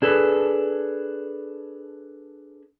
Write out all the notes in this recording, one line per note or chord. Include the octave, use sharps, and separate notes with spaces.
D4 G#4 A4 B4